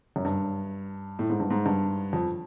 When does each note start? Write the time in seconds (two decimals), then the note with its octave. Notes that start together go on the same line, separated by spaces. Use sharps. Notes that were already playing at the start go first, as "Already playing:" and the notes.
0.16 F#2
0.25 G2
1.19 A2
1.29 G#2
1.40 G2
1.50 G#2
1.66 G2
2.13 F2